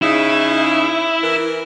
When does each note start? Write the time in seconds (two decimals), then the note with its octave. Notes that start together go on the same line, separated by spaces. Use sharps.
0.02 C#3 D#4 E4
1.22 E3 A#4